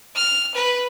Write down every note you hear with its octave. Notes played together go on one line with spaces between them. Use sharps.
F6
B4